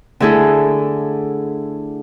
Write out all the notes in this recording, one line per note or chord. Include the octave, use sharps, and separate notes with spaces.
D3 A3 E4 G#4 A4